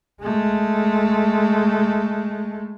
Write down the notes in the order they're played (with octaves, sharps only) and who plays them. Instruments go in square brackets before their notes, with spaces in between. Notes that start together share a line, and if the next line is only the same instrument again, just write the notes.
[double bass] G#3 A3